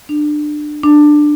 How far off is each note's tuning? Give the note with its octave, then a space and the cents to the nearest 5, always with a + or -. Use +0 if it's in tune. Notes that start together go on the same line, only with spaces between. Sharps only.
D4 +25
D4 +15